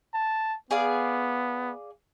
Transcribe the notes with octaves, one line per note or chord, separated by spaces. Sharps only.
A5
B3 G#4 D5 F5